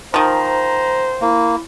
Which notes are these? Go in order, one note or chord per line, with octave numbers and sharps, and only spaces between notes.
D#3 F3 C5 A#5
A#3 E4